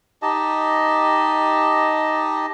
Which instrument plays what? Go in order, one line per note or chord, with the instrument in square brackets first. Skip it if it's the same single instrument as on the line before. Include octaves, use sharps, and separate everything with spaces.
[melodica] D#4 G4 D#5 A5